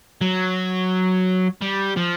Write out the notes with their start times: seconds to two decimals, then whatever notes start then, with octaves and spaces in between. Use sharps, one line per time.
0.21 F#3
1.61 G3
1.96 F3